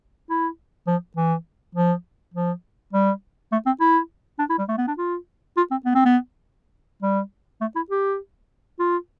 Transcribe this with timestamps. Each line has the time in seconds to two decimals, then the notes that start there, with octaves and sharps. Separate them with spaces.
0.30 E4
0.87 F3
1.16 E3
1.75 F3
2.34 F3
2.93 G3
3.52 A3
3.66 C4
3.80 E4
4.39 D4
4.49 E4
4.58 G3
4.68 A3
4.78 B3
4.88 D4
4.98 F4
5.57 F4
5.71 C4
5.85 B3
5.95 C4
6.05 B3
7.02 G3
7.61 A3
7.76 E4
7.90 G4
8.79 F4